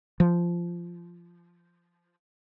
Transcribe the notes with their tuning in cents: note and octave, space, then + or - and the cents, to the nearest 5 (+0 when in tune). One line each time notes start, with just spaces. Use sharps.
F3 -15